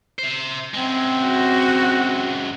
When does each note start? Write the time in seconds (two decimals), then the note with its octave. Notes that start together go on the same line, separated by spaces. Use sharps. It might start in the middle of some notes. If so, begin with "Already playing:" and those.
0.19 C5 E5
0.74 F#2 G#3 C4
1.24 F#4